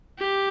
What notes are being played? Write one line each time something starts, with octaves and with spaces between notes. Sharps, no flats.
G4